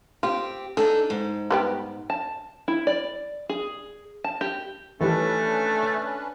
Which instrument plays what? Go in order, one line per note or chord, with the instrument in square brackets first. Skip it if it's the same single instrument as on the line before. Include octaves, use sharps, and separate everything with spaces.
[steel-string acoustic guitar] C4 G4 [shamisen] F4
[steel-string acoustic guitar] D4 D#4 A4 [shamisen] G#4
[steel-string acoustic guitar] G#2
[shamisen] G3 B3 G4
[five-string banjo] A5
E4
D5
G#4
A5
G4
[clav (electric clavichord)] D#3 E3 G3 [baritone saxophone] A3 [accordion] C#4 D4 B4